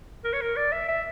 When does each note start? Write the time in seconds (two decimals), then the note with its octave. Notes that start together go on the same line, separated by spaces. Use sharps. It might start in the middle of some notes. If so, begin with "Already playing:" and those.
0.24 A#4
0.33 C#5
0.41 A#4
0.57 D5
0.72 E5
0.89 E5